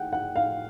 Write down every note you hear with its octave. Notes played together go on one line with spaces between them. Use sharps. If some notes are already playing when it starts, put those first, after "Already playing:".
Already playing: F#5 G5
F#5
F5